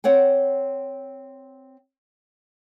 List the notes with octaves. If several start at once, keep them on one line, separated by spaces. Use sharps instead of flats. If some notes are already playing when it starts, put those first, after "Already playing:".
C4 C#5 F#5 G5